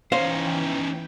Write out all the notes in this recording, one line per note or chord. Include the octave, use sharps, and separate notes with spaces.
E3 C#4 D#4 C5 F5 G5